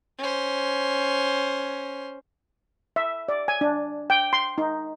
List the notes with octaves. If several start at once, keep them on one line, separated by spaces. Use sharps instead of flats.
C#4 C5
E5
D5
G#5
D4
G5
C6
D#4